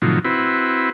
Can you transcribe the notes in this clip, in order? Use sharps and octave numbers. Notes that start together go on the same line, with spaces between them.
A2 C3 D#3 F3 F#3
C4 E4 F#4 B4